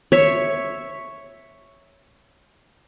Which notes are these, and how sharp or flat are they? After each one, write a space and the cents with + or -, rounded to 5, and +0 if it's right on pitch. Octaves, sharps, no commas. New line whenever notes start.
C#5 +0 E5 +0